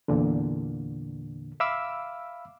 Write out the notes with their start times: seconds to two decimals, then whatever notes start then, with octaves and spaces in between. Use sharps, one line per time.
0.08 E2 A#2 D3
1.60 E5 F5 B5 D6 E6